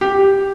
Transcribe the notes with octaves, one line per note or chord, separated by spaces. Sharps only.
G4